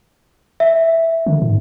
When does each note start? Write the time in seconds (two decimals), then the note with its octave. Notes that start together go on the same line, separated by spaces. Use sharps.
0.60 E5
1.26 D3
1.42 G#2